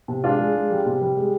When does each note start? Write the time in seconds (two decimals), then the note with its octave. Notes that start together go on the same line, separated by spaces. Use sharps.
0.08 C3
0.24 G#3 D4 F4
0.39 G#3
0.55 G#3
0.70 G3
0.86 C3
1.01 G3
1.16 G#3